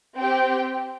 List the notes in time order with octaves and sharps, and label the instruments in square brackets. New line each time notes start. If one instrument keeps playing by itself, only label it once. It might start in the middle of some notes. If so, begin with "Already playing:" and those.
[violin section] C4 G4 G5